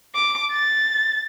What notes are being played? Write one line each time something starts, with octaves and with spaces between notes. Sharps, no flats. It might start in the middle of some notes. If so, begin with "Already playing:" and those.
D6
A6